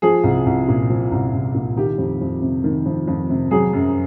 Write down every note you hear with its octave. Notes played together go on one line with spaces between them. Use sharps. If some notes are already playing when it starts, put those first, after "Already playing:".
F3 G#4
C2
C2
A#2
F3
C2
C2
A#2
D#3 G4
F2
F2
C3
D#3
F2
F2
C3
F#3 G#4
F#2